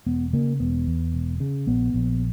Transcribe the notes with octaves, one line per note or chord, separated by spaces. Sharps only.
E1 B3
C#3 A#3
E1 B3
E2
E1
C#3
A#1 B3
A#1